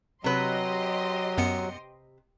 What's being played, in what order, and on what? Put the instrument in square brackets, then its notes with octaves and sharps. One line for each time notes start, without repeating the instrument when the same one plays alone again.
[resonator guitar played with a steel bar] C3 B4 [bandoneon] F#3 [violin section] G4 D#5 C6
[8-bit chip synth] F#2 B3 C#7